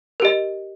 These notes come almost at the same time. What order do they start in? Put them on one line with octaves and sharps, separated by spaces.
A#4 G4 D#5